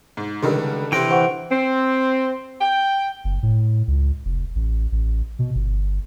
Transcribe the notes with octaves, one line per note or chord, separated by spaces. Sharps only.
G#2
C#2 D3 D#3 G3
C3 E3 C4 G5 A#5
C5 F#5 C#6
C4
G5
F#1
A2
C#2
F1
A1
A1
B2
G1